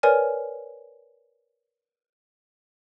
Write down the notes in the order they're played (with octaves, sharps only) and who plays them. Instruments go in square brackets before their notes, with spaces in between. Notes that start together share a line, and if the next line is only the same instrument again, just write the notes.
[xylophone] A#4 B4 C#5 D5 G#5 F6